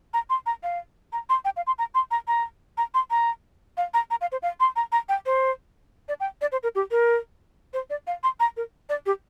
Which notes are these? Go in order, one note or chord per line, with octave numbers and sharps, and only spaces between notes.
A#5
C6
A#5
F5
A#5
C6
G5
F5
C6
A#5
C6
A#5
A#5
A#5
C6
A#5
F5
A#5
A#5
F5
C5
F5
C6
A#5
A#5
G5
C5
D5
G5
D5
C5
A#4
G4
A#4
C5
D5
F5
C6
A#5
A#4
D5
G4